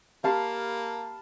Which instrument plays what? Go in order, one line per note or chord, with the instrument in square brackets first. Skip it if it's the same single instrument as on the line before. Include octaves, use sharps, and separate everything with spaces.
[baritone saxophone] A#3 [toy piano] G4 [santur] F5 A5 B5